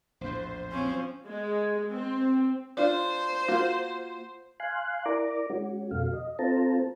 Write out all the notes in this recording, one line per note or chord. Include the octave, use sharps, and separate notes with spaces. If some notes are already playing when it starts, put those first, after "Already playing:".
A#1 E2 A2 C5
F3 C4 C#4
G#3
C4
D4 F4 C5
A#3 F4 F#4
F5 G#5 C6 F#6
E4 A#4 D5 A#5 D6
G#3 C#4 F#4
F2 B2 F#4 A4 F5
D#5
C4 F4 A4 C5 A5 A#5